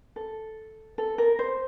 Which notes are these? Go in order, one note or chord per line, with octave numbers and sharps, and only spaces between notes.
A4
A4
A#4
C5